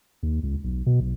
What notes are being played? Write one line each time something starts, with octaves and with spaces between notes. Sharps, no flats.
D#2
C#2
B1
B2
B1